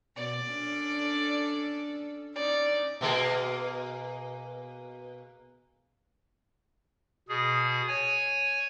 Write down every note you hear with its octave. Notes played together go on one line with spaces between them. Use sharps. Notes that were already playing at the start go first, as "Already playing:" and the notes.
B2 D5
C#4 D4 A4
C#4 D#4 D5
B2 A#3 G#4
B2 G#4
C#5 G#5